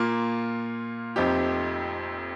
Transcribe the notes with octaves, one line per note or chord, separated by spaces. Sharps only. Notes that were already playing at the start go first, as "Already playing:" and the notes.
Already playing: A#2 A#3 F4
F1 F2 F3 D#4 G4